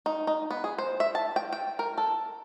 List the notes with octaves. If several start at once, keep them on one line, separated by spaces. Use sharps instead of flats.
D#4
D#4
B3
G#4
C5
E5
A5
G5
G5
A#4
A4